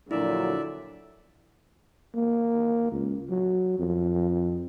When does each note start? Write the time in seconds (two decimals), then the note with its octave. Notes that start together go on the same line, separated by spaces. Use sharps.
0.11 A#1 A#2 D3 F#3 E4 D5 E5
2.15 A#3
2.91 C#2
3.29 F#3
3.78 F2